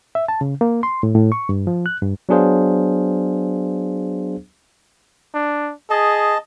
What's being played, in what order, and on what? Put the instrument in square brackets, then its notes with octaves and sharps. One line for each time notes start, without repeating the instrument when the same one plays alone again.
[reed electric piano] E5
A5
C#3
A#3
C6
A2
A2
C#6
G2
F3
F#6
G2
[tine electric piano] F#3 B3 D4 G#4 C5 F5
[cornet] D4
[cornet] G#4 [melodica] D#5 A5